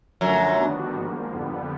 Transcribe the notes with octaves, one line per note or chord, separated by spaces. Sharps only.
F#2 D3 F3 F#3 A3
D#3 G3 B3 D4 F#4
G#2 F3 A#3
F2 D3 G3 B3